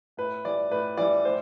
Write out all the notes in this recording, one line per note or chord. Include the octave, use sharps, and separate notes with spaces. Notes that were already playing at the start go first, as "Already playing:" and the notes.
A2 B4
E3 G3 D5
A2 B4
E3 G3 D5
A2 C5